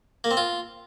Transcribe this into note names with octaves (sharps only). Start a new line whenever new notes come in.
A#3
C4
F4